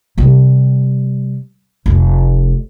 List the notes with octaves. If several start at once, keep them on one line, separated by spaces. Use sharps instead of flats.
C3 G3
F1 A3